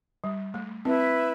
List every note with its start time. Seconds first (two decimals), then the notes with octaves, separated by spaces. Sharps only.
0.24 G3
0.54 A3
0.85 C4 E4 B4 E5